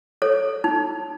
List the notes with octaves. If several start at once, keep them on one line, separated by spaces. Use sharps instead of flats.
A4 C#5
D#4